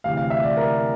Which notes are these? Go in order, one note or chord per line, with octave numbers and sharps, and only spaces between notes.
D2 C3 E3 F5
F5
E5
D5
A#4